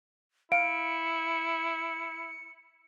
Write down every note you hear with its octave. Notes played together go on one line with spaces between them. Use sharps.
E4 F5 C#7 D7